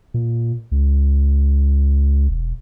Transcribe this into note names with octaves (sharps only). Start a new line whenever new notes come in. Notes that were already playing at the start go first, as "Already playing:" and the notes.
A#2
C#2
E1